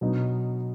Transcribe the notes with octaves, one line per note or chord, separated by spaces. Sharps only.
B2 F#3 B3 D#4